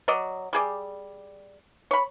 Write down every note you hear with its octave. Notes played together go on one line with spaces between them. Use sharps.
F#3 D5 D#5
G3 G#4 D5
C#5 B5